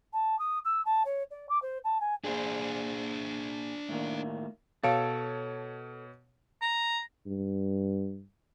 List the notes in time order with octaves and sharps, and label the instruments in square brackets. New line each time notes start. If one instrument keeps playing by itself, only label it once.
[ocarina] A5
D#6
E6
A5
C#5
D5
D6
C5
A5
G#5
[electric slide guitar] A#2 G#4 [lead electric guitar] D4 C5
[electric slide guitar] A2 D#3 A#3
[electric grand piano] B2 C#5 D7 [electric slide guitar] A4 A5 [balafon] F5
[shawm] A#5
[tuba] G2